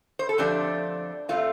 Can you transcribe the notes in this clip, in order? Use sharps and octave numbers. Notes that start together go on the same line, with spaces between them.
C5
A4
F2 D3 F3 A3 C4 D4 G4
C3 A3 C4 F4